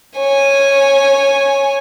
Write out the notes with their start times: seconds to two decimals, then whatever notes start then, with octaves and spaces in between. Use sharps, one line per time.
0.17 C#5 G#5